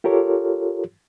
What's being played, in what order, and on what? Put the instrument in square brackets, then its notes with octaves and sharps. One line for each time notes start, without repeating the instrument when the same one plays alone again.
[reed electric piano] F4 G4 A4 A#4 C#5